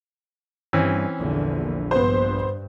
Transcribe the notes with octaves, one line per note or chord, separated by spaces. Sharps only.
G2 E3 C4 C#4
A#1 E2 D3
G2 B3 C5